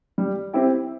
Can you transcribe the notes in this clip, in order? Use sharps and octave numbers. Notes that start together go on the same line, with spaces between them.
G3
C4 E4 G4